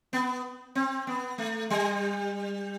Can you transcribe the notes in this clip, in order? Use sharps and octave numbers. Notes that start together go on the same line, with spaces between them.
B3
C4
B3
A3
G3